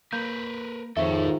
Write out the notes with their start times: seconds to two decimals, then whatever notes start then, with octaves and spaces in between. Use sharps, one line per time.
0.13 A#3 A#4 B4 G6
0.97 F2 G#2 D#3 F3 A4 C#5 E5